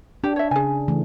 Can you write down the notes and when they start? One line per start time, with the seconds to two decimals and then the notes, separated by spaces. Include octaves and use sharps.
0.24 D4 G4
0.36 C#5 E5
0.51 C#3 G#4 G#5
0.88 C#3 E3 A3